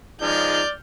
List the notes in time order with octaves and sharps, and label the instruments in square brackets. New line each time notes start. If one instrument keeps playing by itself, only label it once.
[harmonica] F3 G#3 D#4 [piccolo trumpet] D5 [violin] F6 G6